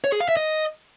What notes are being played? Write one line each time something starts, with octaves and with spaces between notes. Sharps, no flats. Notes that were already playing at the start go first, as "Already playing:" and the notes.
C#5
G#4
F5
E5
D#5